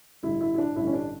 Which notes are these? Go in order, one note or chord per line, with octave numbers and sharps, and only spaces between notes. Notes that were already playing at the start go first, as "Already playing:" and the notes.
A1 G2 D3 E4
E4
E4
D4
A1 G2 D3 E4
C#4
D4